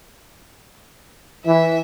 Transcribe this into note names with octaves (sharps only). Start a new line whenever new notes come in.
E3 E5